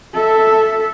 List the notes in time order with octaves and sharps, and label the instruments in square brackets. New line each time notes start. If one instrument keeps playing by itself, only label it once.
[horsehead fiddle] A4 E5